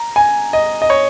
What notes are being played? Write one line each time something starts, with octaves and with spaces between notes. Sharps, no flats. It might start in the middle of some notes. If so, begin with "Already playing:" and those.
Already playing: A#5
G#5
D#5
D#5
C#5